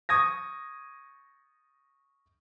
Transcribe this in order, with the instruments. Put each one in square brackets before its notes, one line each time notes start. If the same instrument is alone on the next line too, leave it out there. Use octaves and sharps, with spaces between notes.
[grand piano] C#6 D#6 G#6 A#6